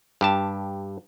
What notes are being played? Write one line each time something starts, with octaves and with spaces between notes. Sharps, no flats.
G2 G4 A5